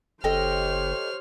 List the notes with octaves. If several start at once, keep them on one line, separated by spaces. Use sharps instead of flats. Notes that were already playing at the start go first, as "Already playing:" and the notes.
F#1 G4 A4 C5 C#5 D#5 G5 F6